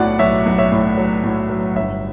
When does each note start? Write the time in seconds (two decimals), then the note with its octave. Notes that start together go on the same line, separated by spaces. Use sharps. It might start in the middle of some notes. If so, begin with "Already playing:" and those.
Already playing: B1 A2 F#3 B3 D5 F#5
0.19 B1 C#5 E5
0.46 B1
0.58 C#5 E5
0.72 A2
0.97 F#3
1.24 A2
1.50 F#3
1.75 G1 C#5 E5